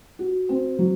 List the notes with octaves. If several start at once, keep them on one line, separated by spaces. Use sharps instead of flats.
F#4
C4
F#3